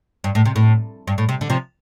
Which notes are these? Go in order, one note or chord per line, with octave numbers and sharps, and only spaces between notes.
G2
A2
C3
A2
G2
A2
C3
D3
C3 F3